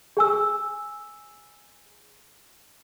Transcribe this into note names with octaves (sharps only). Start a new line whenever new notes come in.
G#4 G#5 E6